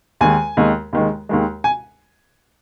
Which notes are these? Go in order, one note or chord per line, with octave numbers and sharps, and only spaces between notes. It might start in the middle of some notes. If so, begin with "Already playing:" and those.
D#2 D#3 G#3 G#5
D#2 D#3 G#3
D#2 D#3 G#3
D#2 D#3 G#3
G#5